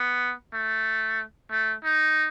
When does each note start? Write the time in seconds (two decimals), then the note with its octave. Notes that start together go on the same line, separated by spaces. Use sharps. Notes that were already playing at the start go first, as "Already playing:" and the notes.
Already playing: B3
0.54 A3
1.51 A3
1.84 D#4